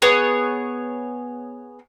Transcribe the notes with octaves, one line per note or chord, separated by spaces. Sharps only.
B3 G#4 C#5